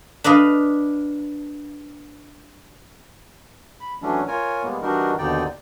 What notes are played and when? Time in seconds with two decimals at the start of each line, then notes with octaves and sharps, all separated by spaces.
0.24 D4 B4 D#5 F5
3.80 B5
4.02 E3 F#3 A3 C#4 D4
4.28 F4 A#4 C#5 G#5
4.64 G3 G#3 A#3 B3
4.82 E3 G3 D4 D#4 F#4 A#4
5.18 D#2 B2 D3 D#4 D5 G5